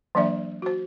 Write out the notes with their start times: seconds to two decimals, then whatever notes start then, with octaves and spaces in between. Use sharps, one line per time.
0.15 E3 F#3 A#3 D4 D5 E5
0.62 F#4 C5